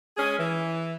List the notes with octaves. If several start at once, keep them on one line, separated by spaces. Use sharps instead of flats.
G#3 C#4 G#4
E3